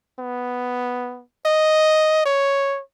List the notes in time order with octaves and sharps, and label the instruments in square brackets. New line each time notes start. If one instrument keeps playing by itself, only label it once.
[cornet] B3
D#5
C#5